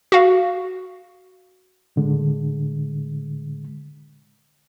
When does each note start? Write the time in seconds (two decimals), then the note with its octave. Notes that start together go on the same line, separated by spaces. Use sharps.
0.12 F#4 F5
1.96 A2 D3 G#3